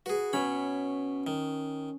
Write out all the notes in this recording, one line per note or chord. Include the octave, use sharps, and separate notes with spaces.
F#4 G#4 B4
B2 C#4 B5
D#3